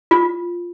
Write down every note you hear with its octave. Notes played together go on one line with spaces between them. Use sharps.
F4